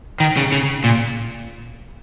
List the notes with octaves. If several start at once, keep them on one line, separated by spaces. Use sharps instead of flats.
D#3
C#3
C#3
A#2